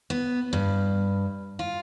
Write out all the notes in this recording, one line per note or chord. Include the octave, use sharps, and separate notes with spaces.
B3
G2
F4